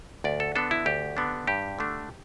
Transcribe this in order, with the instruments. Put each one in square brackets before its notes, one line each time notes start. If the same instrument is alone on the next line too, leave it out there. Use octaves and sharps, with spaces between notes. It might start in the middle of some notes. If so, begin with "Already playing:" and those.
[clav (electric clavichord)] D2 D5
A4
D3 B3 D4 A4
E4
D2 G4
D3 B3 D4
G2 G4
D3 A3 D4